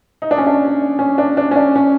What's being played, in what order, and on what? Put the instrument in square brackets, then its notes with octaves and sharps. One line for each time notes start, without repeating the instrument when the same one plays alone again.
[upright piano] D#4
D4
C#4
D4
C#4
D4
D4
C#4
D4
C#4